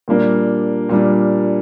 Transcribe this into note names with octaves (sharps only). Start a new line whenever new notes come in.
A#2 G3 A#3 D4
A#2 G3 A#3 D4